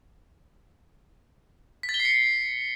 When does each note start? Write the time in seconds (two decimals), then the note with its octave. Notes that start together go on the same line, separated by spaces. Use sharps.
1.83 B6
1.89 A6
1.94 G7
2.00 C7
2.05 C#7